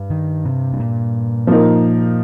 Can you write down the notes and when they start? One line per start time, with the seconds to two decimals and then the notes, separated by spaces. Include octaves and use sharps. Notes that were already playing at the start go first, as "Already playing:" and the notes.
Already playing: G2
0.10 D#3
0.45 C3
0.73 G2
0.80 A#2
1.47 F3 A#3 D#4 A#4